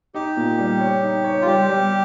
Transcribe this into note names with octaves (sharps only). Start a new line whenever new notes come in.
D#4 G4
A#2
G3
C#5
D#4
C#5
F4
G3 G4
G3